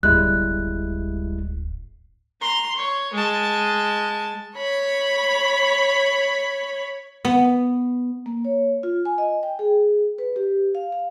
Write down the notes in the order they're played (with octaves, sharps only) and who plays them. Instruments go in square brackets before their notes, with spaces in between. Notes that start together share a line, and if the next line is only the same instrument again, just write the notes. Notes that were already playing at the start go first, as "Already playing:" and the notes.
[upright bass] D1 G1 [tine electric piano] G3 G#3 E4 [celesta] F#6
[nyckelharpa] A#5 C6
C#5
G#3 A5
[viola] C#5 B5
[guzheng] B3
[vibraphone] A#3
C#5
F4
G#5
D#5
G5
G#4
B4
G4
F5
F5